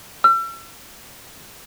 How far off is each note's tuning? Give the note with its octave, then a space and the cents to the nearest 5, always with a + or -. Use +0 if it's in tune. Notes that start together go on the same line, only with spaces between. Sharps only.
E6 +40